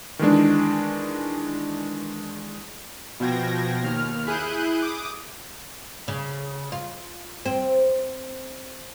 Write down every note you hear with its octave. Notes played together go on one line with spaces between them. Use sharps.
D#3 E3 G#3 D4
B2 F3 G5 G#6 A#6
D#2 F6
E4 G#4 F#6 G6 D#7
D6 D#6
C#3
F4
C4